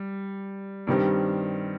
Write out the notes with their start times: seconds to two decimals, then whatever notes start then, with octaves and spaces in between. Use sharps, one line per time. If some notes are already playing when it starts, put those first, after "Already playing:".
Already playing: G3
0.87 G2 D#3 G3 C4